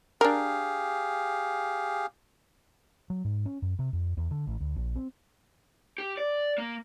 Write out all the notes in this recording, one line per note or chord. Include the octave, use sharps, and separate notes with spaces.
D4 G4 G#4 A#4 F5
F#3
G#2
C#4
F#2
C3
F2
E2
D3
A1
D2
A#1
C4
G4
D5
A#3